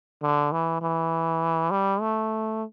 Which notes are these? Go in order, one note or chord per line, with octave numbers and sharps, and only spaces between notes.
D3
E3
E3
G3
A3